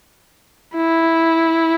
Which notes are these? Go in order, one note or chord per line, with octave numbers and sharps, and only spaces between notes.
E4